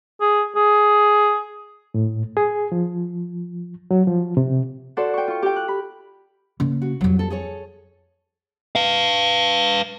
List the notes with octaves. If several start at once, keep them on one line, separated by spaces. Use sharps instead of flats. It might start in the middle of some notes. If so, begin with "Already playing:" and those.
G#4
G#4
A2
G#4
F3
F#3
F3
C3
F#4 A4 C5 D5 F#5
G5 C#6
F4 C#6
G4 G5
F#6
B5
C#3 A#3
F#4
F2 F#3 G3
A4
G#4 A4 C#5
B4 F5